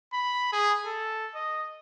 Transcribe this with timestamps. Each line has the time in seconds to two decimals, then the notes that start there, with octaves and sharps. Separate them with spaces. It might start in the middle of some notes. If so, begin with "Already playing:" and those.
0.13 B5
0.52 G#4
0.86 A4
1.35 D#5